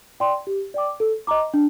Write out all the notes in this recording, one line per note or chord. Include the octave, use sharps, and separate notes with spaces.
D5 G5 C6
G4
D5 G5 D6
A4
D#5 A#5 D6
D4